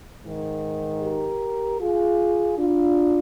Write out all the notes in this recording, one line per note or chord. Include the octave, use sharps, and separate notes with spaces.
G#2 D#3
G4 A#4
F4 G#4
D4 F4